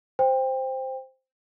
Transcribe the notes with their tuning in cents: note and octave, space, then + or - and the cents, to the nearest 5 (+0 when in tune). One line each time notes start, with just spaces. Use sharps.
C5 +0 G5 +20